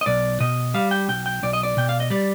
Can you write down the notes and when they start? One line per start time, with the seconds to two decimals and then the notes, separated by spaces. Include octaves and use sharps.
0.01 D#5
0.06 B1 D5
0.40 B2 D#5
0.74 G3 F5
0.91 G5
1.09 B1 G5
1.26 G5
1.43 B1 D5
1.53 D#5
1.63 D5
1.77 B2 G5
1.89 F5
2.00 D#5
2.10 G3 D5